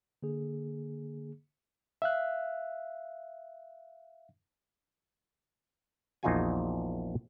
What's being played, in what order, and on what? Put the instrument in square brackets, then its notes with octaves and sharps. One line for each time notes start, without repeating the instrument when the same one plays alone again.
[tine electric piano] D3 A#3 G#4
[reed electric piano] E5 F5 F#6
[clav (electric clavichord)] A#1 E2 D#4 F4 F#4 G#5